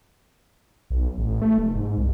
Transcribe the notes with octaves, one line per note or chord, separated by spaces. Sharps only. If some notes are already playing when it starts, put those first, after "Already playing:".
B1
A1
A3
F1
G#2
C2